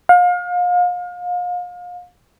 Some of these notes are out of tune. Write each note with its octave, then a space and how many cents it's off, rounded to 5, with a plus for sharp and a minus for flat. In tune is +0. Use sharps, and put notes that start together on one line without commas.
F5 +35